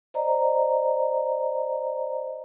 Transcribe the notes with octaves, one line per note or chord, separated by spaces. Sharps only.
C5 D5 D#5 A#5